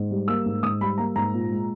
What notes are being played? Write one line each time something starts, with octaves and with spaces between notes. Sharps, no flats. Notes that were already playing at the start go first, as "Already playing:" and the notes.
Already playing: G#2
G3
A#3 E6
G#2
G#2 D#6
G3 B5
A#3 A#5
G#2 A#5
A#2
G#3